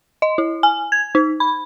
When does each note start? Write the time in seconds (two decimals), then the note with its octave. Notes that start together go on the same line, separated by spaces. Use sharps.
0.22 D#5
0.38 E4
0.63 G#5
0.92 G#6
1.15 D#4
1.40 B5